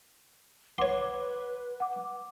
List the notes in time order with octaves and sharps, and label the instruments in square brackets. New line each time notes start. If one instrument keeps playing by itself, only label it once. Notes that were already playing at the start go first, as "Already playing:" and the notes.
[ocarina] B4 [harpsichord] C#5 C6 [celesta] F#5 D6
[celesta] F#5 D6